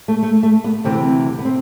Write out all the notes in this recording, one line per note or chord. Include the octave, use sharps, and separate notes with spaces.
A3
A3
A3
B3
D2 C3 E3 C4
B3
C4